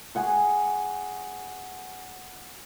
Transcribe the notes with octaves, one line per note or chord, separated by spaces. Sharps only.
G#4 F#5 C#6